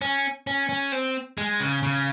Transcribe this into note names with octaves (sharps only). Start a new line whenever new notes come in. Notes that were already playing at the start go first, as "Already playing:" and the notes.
C#4
C#4
C#4
C4
G#3
C#3
C#3